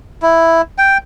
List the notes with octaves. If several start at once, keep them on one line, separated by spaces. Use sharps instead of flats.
E4
G5